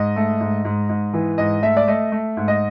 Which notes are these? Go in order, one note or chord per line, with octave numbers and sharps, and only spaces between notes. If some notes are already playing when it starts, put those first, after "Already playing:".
Already playing: G#2 D#5
A3
G#2
G#2
G#2
E3
G#2 D#5
A3 E5
D5
A3 D#5
A3
G#2
D#5